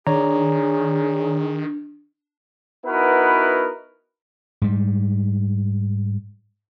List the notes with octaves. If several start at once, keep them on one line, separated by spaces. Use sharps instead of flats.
D#3 D4 G#4 C#5 D5 A#5
B3 D#4 E4 F#4 A#4 B4
G#2 G3